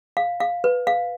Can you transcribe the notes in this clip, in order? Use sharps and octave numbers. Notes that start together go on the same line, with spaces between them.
F5
F5
B4
F5